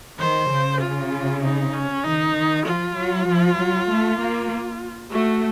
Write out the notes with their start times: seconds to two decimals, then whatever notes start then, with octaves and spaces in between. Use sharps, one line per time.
0.18 D#3 C5
0.50 C#3
0.80 F4
1.42 D#4
1.73 C#4
2.04 D#3 D#4
2.35 D#3
2.66 F3 F4
2.96 F#3
3.28 F3
3.58 F#3
3.88 A3
4.19 A#3
5.11 A3 F#4